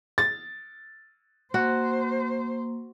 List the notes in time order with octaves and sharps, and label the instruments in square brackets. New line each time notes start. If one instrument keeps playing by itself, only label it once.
[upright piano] A6
[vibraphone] A#3 [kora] F#4 [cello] C5